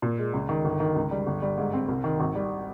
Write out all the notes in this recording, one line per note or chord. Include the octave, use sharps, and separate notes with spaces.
A#2
G#3
C#2
D#3
G1
D#3
C#2
G3
G1
G3
G#2
C4
C2
D#3
G#1
G3